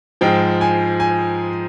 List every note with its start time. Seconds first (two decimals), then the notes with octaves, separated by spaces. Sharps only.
0.21 G#2 F3 G#3 G5
0.61 G#5
1.00 G#5